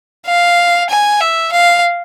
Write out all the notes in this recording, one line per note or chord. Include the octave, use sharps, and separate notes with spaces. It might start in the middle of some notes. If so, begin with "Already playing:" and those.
F5
G#5
E5
F5